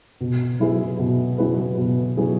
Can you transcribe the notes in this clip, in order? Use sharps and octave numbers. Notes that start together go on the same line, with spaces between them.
B2
F#3 E4 G#4 B4
B2
F#3 E4 G#4 B4
B2
F#3 E4 G#4 B4